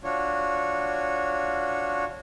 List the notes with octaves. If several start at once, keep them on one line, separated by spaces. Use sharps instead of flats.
D4 F4 F#4 C#5